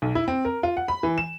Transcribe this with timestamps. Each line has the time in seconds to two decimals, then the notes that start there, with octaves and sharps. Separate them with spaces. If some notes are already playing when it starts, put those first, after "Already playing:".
0.02 B1
0.15 E4
0.28 C4
0.45 A#4
0.63 F4
0.77 F#5
0.88 B5
1.03 E3
1.18 E7